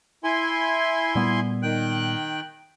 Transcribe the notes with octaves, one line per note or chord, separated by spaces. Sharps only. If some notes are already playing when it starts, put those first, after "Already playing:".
E4 G#5 C6
A#2 G3 B3
D#3 G5 F#6